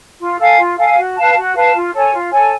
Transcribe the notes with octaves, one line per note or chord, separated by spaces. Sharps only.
F4
A4 F5 G#5
F4
A4 F5 G#5
F#4
B4 F5 A5
F#4
B4 F5 A5
F4
A4 C#5 G#5
F4
A4 C#5 G#5